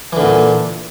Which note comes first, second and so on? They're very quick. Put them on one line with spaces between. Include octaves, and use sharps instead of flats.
E3 D3 A#2